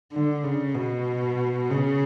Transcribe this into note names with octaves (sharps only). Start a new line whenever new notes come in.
D3
C#3
B2
C#3